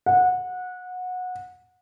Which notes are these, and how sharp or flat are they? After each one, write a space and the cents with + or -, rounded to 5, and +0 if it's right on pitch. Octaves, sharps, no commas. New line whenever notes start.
F#5 -20